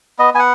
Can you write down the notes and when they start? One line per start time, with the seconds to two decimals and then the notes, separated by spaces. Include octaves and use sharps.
0.19 B3 D#5
0.34 B3 G#5
0.39 F#5